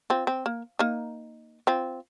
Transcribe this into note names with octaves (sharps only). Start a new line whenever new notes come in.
C4 F4
C4
A#3
A#3 D#4
C4 F4